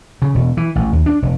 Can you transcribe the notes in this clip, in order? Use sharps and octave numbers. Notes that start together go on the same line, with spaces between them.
C#3
E1
E3
A1
D#2
D4
F1